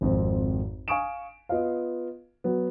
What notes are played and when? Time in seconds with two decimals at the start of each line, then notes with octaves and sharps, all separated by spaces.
0.01 G#1 F2 C4
0.88 F5 G#5 C#6 D#6 D7 E7
1.49 B3 F4 D#5 F5
2.44 F#3 B3